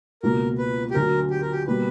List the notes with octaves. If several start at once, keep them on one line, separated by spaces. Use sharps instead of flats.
C#2 B2 A#3 A#4
B4
G4
D2 D3 F#3 A#4
G4
A#4
G4
B2 G3 A#3 B4